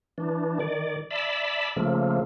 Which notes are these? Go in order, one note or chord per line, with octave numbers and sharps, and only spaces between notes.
E3 D4
D#3 D5
D5 E5 A5 B5
C#3 F3 A3 A#3